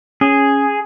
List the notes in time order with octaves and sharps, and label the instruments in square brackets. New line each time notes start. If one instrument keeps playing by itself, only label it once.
[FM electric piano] C#4 [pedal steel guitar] G#4